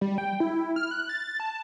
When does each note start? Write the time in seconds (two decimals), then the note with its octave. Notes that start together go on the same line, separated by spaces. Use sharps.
0.01 G3
0.18 G5
0.40 E4
0.76 F6
0.91 F#6
1.09 A6
1.40 A5